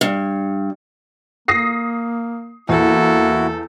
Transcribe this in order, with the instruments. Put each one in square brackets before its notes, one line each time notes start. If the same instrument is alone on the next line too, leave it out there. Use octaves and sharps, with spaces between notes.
[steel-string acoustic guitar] G2
[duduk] A#3 [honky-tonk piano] D#6 A#6 C7
[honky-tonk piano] E2 [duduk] A#3 [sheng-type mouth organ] E4 F#4 [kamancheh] A4